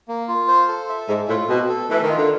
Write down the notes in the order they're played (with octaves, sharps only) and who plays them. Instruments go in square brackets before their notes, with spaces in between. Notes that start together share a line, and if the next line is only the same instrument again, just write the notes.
[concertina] A#3
F4
C5
A4
E5
[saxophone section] G#2 [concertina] G#3
[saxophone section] A2 [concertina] F4
[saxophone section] B2 [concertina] C4
[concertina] A4
[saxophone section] E3 [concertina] A3
[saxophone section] D#3
[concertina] F4
[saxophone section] D3